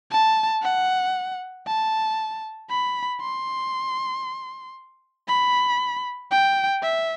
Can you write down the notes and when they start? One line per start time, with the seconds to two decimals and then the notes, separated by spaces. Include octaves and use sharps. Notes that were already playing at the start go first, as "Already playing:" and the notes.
0.11 A5
0.62 F#5
1.67 A5
2.70 B5
3.21 C6
5.28 B5
6.31 G5
6.83 E5